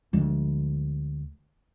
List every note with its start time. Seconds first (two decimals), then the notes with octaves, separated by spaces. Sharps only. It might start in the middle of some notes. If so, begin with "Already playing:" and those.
0.13 D2 F3 G#3 D4